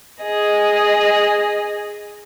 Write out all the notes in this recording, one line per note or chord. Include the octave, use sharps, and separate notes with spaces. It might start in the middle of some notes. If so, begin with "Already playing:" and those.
G#4 D#5